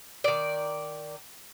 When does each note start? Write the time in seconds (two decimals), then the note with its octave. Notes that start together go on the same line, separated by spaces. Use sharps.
0.24 D#3 D5